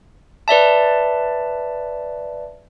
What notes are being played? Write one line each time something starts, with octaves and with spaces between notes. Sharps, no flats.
B4 D5 E5 A5